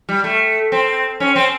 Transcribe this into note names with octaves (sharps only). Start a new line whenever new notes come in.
G3
A3
C4
C#4
C4